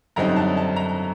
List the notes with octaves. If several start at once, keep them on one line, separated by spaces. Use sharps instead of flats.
F#2 D3 G3 C4 D#4 A#5
A5
A5
A#5